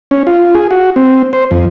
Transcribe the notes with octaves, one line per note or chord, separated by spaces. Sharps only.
C#4
F4
G#4
F#4
C4
C5
F2